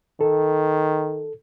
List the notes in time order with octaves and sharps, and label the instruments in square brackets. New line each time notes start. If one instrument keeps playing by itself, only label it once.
[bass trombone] D#3 [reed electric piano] A4